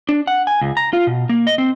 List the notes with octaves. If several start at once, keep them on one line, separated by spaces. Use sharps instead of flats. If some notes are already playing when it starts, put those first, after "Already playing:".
D4
F#5
G#5
C#2
A#5
F4
B2
A#3
D#5
C4